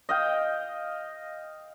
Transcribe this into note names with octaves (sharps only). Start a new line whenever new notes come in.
D#5 F5 G5